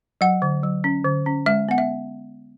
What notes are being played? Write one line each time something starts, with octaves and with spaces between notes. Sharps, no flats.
F#3 F#5
D3
F#3
C#4
D3
C#4
G#3 E5
B3 F#5
E5